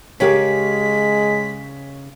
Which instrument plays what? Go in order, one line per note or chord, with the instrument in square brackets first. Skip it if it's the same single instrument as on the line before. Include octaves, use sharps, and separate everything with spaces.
[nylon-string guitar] C#3 G4 [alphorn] G#3 [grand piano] G#4 A#4 C#5 [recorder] B6